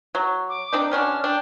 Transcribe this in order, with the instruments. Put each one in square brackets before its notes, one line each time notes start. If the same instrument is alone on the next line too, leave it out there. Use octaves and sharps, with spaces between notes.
[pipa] F#3
[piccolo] D6
[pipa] C4 D4 D#4
[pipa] B2 C#4 D4 [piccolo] F6
[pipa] D4 [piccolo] G5